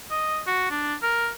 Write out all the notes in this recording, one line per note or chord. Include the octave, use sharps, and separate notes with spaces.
D#5
F#4
D4
A#4